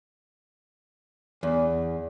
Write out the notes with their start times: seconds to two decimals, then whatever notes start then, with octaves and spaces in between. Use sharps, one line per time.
1.43 E2